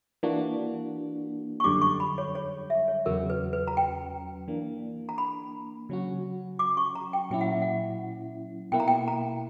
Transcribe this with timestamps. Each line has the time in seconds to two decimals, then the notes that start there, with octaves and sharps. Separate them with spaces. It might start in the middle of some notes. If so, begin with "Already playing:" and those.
0.23 E3 A#3 D4 F#4
1.60 C#6
1.64 F#2 D3 G3 D6
1.82 C#6
2.00 B5
2.18 C#5
2.35 C#5
2.70 E5
2.88 C#5
3.06 E2 C#3 F#3 C#4 F#4 A#4
3.30 B4
3.53 B4
3.68 A#5
3.77 G5
4.48 E3 A#3 D4
5.09 A#5
5.18 B5
5.89 C#3 F#3 C#4 F#4
6.59 D6
6.77 C#6
6.95 A#5
7.13 G5
7.30 A#2 F#3 C#4 E4 G5
7.41 F#5
7.51 E5
7.62 F#5
8.72 B2 A#3 E4 G5
8.80 A#5
8.88 G5
9.08 A#5